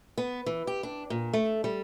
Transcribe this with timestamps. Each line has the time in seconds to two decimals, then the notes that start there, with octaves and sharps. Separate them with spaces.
0.18 B3
0.46 E3
0.67 G4
0.83 D4
1.10 A#2
1.33 A3
1.64 G3